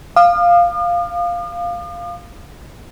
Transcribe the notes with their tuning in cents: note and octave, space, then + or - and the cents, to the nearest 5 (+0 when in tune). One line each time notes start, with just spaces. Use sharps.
F5 +0 D#6 -45